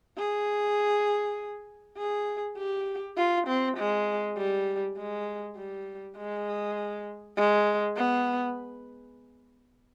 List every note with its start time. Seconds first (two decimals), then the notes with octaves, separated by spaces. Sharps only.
0.18 G#4
1.98 G#4
2.58 G4
3.17 F4
3.47 C4
3.77 G#3
4.37 G3
4.97 G#3
5.57 G3
6.17 G#3
7.37 G#3
7.96 B3